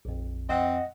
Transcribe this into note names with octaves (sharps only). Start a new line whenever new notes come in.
A#1 F2
F2 C4 D#5 F#5